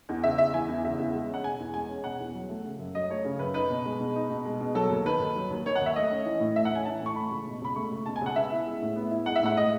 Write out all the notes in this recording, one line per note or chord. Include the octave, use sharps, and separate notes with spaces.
E2
C#3 E5
E2 E5
E3 G#5
E2
C#3 E5
E2
G#3
C#4
F#5
B2 G#5
E2
G#3 G#5
C#4
B2 F#5
E2
F#3
A3
C#3
F#2
F#3 D#5
A3 C#5
C#3
F#2 B4
D#4 B4
B2
G#3
B2
D#4
B2
G#3
B2
F#3 A4
D#2
D#3 B4
D#2
F#3
D#2
D#3 C#5
F#5
D#2
E5
A3 D#5
C#4
E3
A2
A3 E5
F#5
C#4 G#5
E3 A5
A2
C#6
A3 B5
C#2
B2
C#2 B5
A3 C#6
C#2
B2 A5
G#5
C#2 F#5
B3 E5
E4
G#3
A2
B3
E4
G#3 F#5
E5
A2 F#5
G#3 D#5